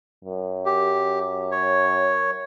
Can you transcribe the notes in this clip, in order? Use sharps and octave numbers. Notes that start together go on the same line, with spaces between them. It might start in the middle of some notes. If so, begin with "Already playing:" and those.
F#2
G4
C#5